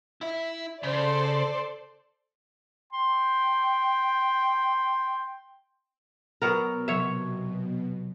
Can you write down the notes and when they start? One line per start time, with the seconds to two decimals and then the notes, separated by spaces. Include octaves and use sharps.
0.21 E4 E5
0.83 C#3 A4 C5 D5
2.93 G5 C6
6.42 B2 F#3 B3 A#4
6.88 C3 F#3 C#5 E5